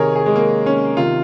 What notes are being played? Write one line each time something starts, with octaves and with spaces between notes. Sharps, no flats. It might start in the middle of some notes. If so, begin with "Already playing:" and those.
Already playing: C3 D#3 G#4 A#4 C#5
G#4
G#3
A#3
C#4
C3 D#3 F4